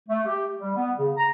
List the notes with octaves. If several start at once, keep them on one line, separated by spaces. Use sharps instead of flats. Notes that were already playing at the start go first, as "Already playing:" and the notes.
A3
G4
G3
B3
C#3
A#5